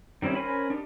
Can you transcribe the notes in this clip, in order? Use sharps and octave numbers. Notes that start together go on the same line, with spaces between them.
D#3 G3 C4 C#4 E4
C#4 A#4 C5 G#5 B5
D4 D#4 G4